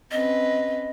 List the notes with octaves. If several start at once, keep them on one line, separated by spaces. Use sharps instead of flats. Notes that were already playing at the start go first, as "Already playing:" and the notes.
C4 C#4 B4 D#5